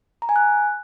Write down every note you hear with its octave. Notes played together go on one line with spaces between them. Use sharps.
A#5
G#5
F#6